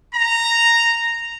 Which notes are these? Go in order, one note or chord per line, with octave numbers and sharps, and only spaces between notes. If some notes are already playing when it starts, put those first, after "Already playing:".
A#5